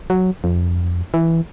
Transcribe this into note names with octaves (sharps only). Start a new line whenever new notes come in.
F#3
F2
E3